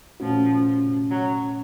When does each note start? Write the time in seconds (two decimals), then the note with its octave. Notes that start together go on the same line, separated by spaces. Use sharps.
0.20 A#2 F3 A3 C#4 F#4
1.11 F#3